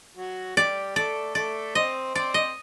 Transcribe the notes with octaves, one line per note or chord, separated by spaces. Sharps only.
F#3 F#4
G3 G4 D5
A3 A4 D5
A3 A4 D5
C4 C5 D#5
C4 C5 D5
D#5